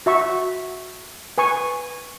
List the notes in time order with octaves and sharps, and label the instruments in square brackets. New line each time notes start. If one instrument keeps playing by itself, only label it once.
[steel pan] F#4 E5 C#6
B4 G#5 C#6